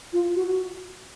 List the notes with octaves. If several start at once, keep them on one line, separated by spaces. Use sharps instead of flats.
F4
F#4